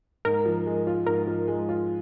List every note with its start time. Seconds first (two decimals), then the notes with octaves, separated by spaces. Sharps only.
0.25 G#2 A#4
0.45 F3
0.66 G#3
0.87 F4
1.07 G#2 A#4
1.27 F3
1.48 G#3
1.69 F4